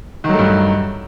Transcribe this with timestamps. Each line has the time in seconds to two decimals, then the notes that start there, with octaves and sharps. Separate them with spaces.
0.24 D#3
0.29 F#3
0.34 A3
0.39 G2